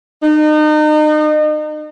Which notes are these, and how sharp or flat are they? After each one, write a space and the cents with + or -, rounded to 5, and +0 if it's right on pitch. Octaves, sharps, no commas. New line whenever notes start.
D#4 -35